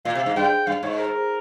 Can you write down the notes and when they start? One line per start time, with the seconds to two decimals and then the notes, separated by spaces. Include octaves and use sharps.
0.05 A#2 F5
0.15 C3
0.26 G#2
0.36 G2 G5
0.67 G2 F5
0.83 G#2 C#5
0.98 A#4